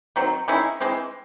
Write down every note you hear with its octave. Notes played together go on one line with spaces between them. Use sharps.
D#3 F#3 C4
D#3 G#3 C#4 E4
E3 G#3 C4